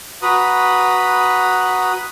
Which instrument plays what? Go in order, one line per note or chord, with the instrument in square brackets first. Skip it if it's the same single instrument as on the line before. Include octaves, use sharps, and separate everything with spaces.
[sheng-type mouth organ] F#4 B4 A#5 B5 D#6